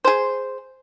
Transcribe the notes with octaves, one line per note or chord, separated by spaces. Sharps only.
G#4 C5